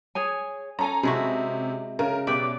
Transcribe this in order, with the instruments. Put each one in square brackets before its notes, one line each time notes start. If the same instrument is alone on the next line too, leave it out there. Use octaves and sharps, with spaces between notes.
[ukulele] G#4 C#5 G#5
[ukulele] C#4 A4 G#5 [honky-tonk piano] A#5
[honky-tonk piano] C3 [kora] G#3 E4 F#4
[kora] C#3 [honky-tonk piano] A#4
[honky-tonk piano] B2 D6 [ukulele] G4 B4 E5 [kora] D5